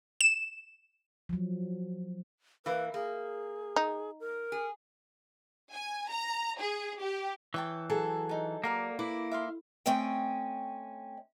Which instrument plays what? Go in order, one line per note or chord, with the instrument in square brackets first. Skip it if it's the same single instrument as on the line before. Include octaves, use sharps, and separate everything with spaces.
[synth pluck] E7
[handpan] F3 F#3
[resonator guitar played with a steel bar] E3 A#3 [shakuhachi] B4
[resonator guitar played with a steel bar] A#3 [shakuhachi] G#4
[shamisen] D#4
[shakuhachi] A#4
[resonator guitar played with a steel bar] G#4
[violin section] G#5
A#5
G#4
G4
[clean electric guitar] E3 [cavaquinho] C#5 G5 A5
[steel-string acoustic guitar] F#3 G#4 A4 [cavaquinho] A5
[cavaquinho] D#4 A5
[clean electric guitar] A#3 [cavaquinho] F#4 A#4 D5
[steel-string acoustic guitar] E4 [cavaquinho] B4 B5 D6
[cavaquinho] E5 F5 C6
[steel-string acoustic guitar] A3 C4 C#4 D#5 G5